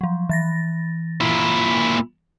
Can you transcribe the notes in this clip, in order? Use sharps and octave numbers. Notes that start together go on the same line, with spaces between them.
F3 F#3
E3 A6 A#6
A#2 E4